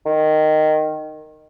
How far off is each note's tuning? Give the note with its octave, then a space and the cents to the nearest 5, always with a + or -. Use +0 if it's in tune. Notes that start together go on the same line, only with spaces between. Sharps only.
D#3 -10